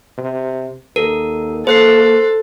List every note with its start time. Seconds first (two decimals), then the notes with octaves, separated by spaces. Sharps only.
0.18 C3
0.96 D#2 A4 A#4
1.67 A#3 A4 C5 F#6 C7